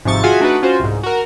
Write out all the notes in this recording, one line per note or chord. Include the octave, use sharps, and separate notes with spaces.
G#1 G#2 C3 F3 C#6 A6
F4 F#4 G#4 E5 F#5 G#5
A3 D4 D#4 F#4 A4 B4
C#4 F4 F#4 C5
C2 G#2
F#4 A#4